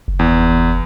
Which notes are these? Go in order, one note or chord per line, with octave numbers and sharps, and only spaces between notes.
F#1
E2